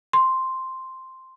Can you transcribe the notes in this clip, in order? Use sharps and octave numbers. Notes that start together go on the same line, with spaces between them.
C6